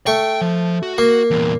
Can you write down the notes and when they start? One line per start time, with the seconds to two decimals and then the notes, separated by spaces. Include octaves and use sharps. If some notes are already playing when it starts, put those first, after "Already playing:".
0.07 A3 G5 C#6
0.41 F3
0.83 F#4
0.98 A#3
1.31 E2 A#2